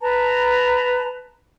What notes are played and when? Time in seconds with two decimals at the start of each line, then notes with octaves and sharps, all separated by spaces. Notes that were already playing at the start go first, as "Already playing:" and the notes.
0.01 B4 A5 A#5